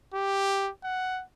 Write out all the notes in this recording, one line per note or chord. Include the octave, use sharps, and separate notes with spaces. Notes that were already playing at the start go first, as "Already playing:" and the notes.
G4
F#5